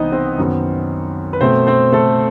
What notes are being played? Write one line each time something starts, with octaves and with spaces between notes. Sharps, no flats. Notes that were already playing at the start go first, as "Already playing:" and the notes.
Already playing: C2 C3 E3 B3 C4 D#4 C5 D#5
C4 C5
F#2 D#3 F#3 B3
B4
B2 A3 C4 C5
C4 C5
A3 A4